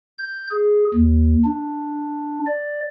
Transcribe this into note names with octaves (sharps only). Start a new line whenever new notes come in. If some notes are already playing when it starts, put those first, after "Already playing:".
G6
G#4
D#2
D4
D5